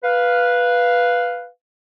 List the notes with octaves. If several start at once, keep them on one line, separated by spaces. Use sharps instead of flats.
B4 F5